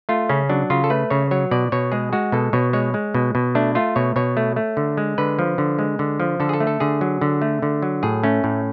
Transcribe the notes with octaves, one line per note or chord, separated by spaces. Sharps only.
A3 F4
C#3 C#4
F#3 D4
C#3 F4
A4
A3 B4
C#3 C#5
F#3 C#5
B2 D5
B2 C#5
G#3 G#4
G#3 F#4
B2 A4
B2 C#5
G#3 C#5
G#3
B2
B2
A3 D4
A3 F4
B2 C#5
B2 C#5
A3
A3
D3
G#3
D3 B4
F3
D3
G#3
D3
F3
D3 A4
G#4
A4
A3
A4
D3 G#4
F#3
D3
A3
D3
F#3
A2 G#4
A3 C#4
A2